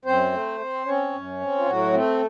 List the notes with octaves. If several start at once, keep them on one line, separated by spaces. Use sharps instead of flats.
F#2 C4 C5
A3
C4
C4 C#4 C#5
F#2
C4
F4
A2 F#3 F#4
A3 C4